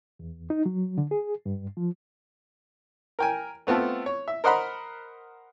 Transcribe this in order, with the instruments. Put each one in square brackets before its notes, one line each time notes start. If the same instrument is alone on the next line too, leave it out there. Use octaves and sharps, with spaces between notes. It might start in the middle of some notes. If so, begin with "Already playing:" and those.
[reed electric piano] E2
D#4
F#3
D3
G#4
G2
F3
[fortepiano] A#4 G5 G#5
A3 B3 C4 F4 A4
C#5
E5
A#4 C5 D#5 F#5 A#5 B5